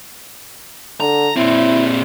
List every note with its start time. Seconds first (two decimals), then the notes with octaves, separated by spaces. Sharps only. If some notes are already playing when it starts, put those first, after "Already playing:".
1.00 D3 A#5
1.37 A#2 C4 E4